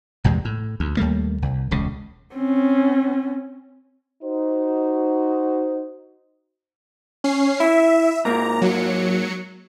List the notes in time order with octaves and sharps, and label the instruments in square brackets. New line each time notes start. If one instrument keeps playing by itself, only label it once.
[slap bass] A#1 E2 C3 G#3
A2
D2
D#2 G3 A3 A#3
C2
E1 C#2 C#3
[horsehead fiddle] C4 C#4
[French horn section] D#4 F#4 C5
[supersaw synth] C#4 C7
[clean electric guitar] E4 [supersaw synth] E5
[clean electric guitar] G#2 A#3 [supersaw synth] A#5
[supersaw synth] F#3 C#7